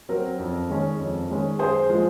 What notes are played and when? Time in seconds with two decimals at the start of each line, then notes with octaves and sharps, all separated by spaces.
0.09 F#3 C4 A#4
0.39 F2
0.70 D#3 G#3 C#4
1.00 F2
1.29 D#3 G#3 C#4
1.59 F#2 G#4 C5
1.90 F3 G#3